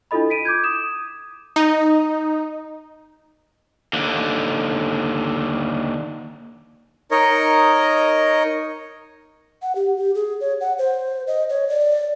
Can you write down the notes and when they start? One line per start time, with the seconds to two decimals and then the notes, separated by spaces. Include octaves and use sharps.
0.11 D4 E4 F4 A4 D#5 B5
0.30 B6 D7 D#7
0.45 D6 G6 G#6
0.64 D#6 E7
1.56 D#4
3.93 D#2 D3
7.11 D#4 A#4 C#5 D#5
9.62 F#5
9.75 G4
9.97 G4
10.15 G#4
10.41 C#5
10.61 F#5
10.78 C5
11.27 D#5
11.50 C#5
11.69 D5